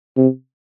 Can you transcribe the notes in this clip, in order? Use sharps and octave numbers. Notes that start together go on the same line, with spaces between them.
C3